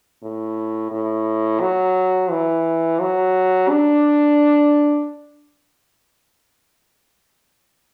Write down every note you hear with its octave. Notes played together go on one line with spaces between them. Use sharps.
A2
A2
F#3
E3
F#3
D4